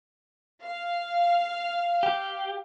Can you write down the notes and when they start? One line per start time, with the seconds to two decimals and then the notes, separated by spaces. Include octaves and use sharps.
0.61 F5
2.03 G4